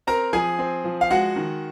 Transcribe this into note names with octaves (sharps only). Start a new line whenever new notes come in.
C4 A#4 A#5
F3 G#4 G#5
C4
F3
F5
G#3 F#4 F#5
D#3